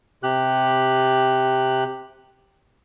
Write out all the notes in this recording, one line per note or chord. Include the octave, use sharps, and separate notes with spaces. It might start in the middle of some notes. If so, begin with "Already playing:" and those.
C3 G4 F#6